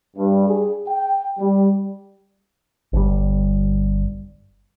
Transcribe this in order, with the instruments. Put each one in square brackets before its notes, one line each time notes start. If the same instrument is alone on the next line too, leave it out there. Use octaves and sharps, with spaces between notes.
[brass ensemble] G2
G#4
G5
G3
[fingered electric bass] G1 G3